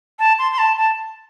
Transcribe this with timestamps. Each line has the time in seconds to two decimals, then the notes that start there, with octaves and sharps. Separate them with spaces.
0.19 A5
0.39 C6
0.52 C6
0.58 A5
0.78 A5